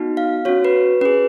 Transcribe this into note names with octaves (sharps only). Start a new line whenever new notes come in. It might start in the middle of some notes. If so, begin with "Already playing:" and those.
Already playing: B3 D#4 F#4
F5
C#4 F#4 C#5
B4
C#4 G#4 B4